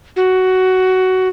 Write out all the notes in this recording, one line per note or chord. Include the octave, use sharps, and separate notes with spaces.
F#4